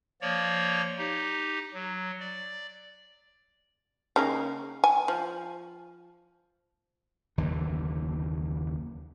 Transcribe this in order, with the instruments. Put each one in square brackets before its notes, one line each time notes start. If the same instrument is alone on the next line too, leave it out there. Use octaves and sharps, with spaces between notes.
[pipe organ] F3 A#3 C#5 D5
D#4 G4
F#3
D5
[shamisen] C#3 A#3 D#4
G#5
F3
[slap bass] F#1 D#2 D3 E3